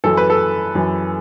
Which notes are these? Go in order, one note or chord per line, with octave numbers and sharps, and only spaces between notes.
F#2 E3 A4
B4
A4
F#2 E3